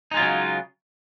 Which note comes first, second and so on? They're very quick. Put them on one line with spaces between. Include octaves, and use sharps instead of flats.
D#4 G#3 F4 F#3 C#3